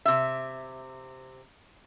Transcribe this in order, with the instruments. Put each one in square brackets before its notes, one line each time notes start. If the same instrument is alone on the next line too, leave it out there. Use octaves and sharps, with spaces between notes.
[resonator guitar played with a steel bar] C3 E5